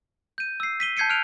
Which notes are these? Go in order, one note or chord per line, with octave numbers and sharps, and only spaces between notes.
G6 D#7
E6 C7
B6 D#7 G7
A5 G6 G#6 C7 C#7 D#7
F6 F#6 D7 F7